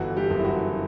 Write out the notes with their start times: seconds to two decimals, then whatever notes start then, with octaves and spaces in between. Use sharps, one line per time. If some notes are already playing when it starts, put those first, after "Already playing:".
Already playing: G1 E3 F#4
0.17 G3 G4
0.30 F#1
0.40 E4
0.45 F#4